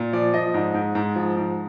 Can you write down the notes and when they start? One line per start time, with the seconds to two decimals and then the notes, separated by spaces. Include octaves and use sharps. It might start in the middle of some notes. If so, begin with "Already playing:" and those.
Already playing: A#2
0.13 F3 D5
0.34 F3 D#5
0.54 G#2
0.74 G#2
0.95 G#2
1.16 F3
1.37 G#2